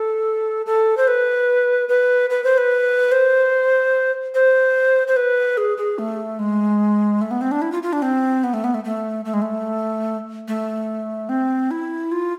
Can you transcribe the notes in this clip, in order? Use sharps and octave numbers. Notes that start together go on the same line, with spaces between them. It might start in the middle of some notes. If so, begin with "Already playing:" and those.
Already playing: A4
A4
C5
B4
B4
B4
C5
B4
C5
C5
C5
B4
G#4
G#4
A3
G#3
A3
B3
C4
D4
E4
F4
F4
D4
C4
B3
A3
B3
A3
A3
A3
G#3
A3
A3
C4
E4
F4